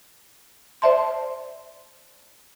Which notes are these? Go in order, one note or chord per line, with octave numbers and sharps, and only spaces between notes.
C5 D5 E5 A5 C6